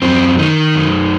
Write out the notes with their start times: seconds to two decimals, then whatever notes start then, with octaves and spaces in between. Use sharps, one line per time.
0.02 F#2 C4
0.38 D#3 D#4
0.75 F#2